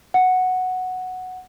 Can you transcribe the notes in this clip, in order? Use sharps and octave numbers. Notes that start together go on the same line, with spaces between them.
F#5